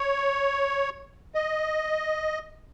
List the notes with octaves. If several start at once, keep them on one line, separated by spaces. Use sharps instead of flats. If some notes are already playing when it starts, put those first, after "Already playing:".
Already playing: C#5
D#5